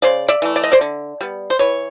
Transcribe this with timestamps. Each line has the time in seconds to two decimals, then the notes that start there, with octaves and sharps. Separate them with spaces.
0.02 C#3 C5 D5
0.29 D5 E5
0.42 E3 A3
0.56 D5
0.64 D#5
0.72 C5 D5
0.81 D3
1.21 G3 B3
1.50 C5
1.59 E3 B4 C#5